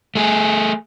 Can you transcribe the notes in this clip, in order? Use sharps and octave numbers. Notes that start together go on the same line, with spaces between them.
A3 G#4